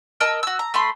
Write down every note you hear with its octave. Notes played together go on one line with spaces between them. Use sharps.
A#4 D#5 A5 E6
F#4 E6
A#5
A3 B5 C6